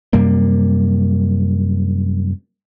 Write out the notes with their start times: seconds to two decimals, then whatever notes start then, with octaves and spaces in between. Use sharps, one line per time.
0.13 F#2 C3 G3 A#3